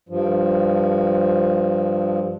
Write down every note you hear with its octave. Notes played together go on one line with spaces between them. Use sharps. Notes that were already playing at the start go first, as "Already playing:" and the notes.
G2 F3